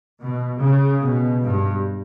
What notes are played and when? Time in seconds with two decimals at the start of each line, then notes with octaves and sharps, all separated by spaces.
0.21 B2
0.60 C#3
1.02 B2
1.42 G2